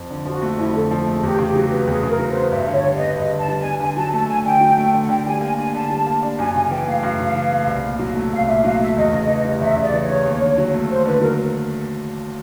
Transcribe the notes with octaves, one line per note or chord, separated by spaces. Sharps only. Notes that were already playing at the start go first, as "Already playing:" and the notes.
Already playing: F2
D3
F3 F#4
A3
F2 E4
D3 A4
F3
A3 G#4
E2 G4
C#3
G4
F#3
G4
B3
E2 G#4
C#3
A#4
F#3
B3 C5
G2 E5
D3 C#5
G3
B3 D#5
G2 D#5
D3
A5
G3
B3 G#5
D3 G#5
F#3 A5
A3 A5
D3 G#5
D3 G5
F#3
A3
D3
F#5
D3 G5
G3 G#5
A#3 G#5
D4 G#5
D3 A5
G3
A#3
D4
F#2 G#5
C#3 G#5
E3 G5
A3 F5
F#2
C#3
E3
A3
C2
A#2
F#3
A3
C2 F5
A#2 E5
F#3 F5
A3 E5
E2 D#5
C#3
E3
G3
E2 E5
C#3
D5
E3
C#5
G3
D#2
D3
F#3
A3
D#2 C5
D3 B4
F#3 A#4